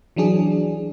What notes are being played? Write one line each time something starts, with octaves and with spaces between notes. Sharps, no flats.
E3 F#3 D4 G#4